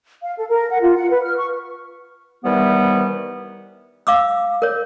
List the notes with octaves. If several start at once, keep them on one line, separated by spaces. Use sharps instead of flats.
F5
A4
A#4
F#5
F4
F#5
B4
F6
C#6
C3 D#3 E3 G3 B3
F5 D6 E6
A#4 C#5